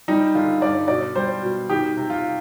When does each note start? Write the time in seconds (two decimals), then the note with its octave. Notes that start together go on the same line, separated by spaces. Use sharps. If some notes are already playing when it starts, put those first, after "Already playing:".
0.08 G3 D#4
0.35 D3 F4
0.61 G2 D5
0.88 B2 D5
1.16 G3 C5
1.42 B2
1.69 D#3 G4
1.97 C3
2.10 F4